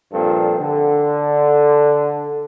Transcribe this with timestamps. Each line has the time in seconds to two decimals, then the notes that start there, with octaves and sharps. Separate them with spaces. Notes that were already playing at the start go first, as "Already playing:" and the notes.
0.13 G2 A#2 F3 C4 A4
0.59 D3